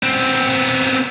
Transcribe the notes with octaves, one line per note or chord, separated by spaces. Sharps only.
B3 C4